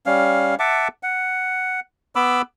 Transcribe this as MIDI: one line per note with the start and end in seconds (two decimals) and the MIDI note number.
0.06 0.55 55
0.06 0.55 61
0.06 0.55 77
0.59 0.88 76
0.59 0.88 78
0.59 0.88 81
0.59 0.88 86
1.03 1.80 78
2.16 2.42 59
2.16 2.42 83
2.16 2.42 86
2.16 2.42 88